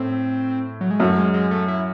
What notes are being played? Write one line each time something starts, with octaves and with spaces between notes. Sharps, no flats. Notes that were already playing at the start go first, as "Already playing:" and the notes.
Already playing: A2 A3 C4
F#3
G#3
F#2 F#3 A3
G#3
G#3
A3
E4